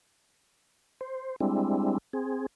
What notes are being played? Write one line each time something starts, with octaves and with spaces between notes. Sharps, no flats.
C5
G3 G#3 C4 D4 E4
C4 G#4